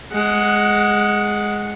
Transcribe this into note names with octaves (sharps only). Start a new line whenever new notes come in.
G#3 F#5